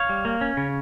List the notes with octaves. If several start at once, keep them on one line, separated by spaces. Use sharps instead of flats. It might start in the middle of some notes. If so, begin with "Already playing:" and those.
Already playing: C#5 F5
G3
A#3
C#4
C#3